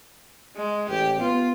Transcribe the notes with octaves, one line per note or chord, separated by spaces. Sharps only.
G#3
A1 G4
B3 F4